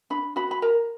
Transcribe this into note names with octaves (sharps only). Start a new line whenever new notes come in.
D4 B5
F#4 B5
B5
A#4 A#5